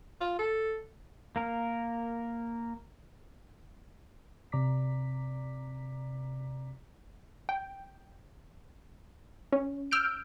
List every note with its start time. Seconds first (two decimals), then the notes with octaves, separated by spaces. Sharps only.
0.21 F4
0.39 A4
1.36 A#3 A#4
4.52 C3 D5 A#5 D6 B6
7.49 G5
9.52 C#4
9.91 E6 F6 G6 D7